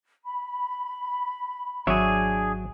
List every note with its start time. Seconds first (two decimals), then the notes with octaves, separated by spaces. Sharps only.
0.24 B5
1.87 G#1 F#3 D4 G#4 C#5 E5